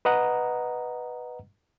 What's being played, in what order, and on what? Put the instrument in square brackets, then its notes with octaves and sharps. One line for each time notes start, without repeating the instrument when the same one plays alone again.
[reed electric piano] B4 D#5 F#5 A#5